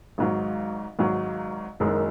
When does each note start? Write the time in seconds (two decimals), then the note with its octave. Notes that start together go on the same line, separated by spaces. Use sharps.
0.18 G#1 G#2 F#3
0.99 G#1 G#2 F#3
1.80 F#1 F#2 D#3 G#3 D#4